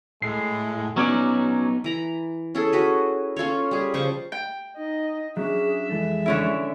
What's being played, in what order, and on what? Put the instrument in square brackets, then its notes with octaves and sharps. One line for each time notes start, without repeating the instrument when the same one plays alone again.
[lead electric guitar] A2 [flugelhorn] G#3 [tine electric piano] C7
[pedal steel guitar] F#3 C#4 D5 [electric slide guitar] B3 D#4
[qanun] E3 A#5 B5
C#4 E4 G#4 A4
C#4 F#4 B4
C#4 F4 A4 C#5
G3 G#4
C#3 F3 C5 C#6
[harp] G5
[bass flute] D#4 [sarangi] D#5
[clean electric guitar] F#3 C#4 D4 [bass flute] G#4 [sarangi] E5
[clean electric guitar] F2 E3 A4 [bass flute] G#3
[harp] D3 C#4 E4